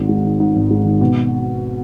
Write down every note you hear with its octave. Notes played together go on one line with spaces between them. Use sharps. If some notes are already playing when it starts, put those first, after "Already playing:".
Already playing: G#1 G#2
G#3
D#3
G#2
G#1
G#3
D#3
B2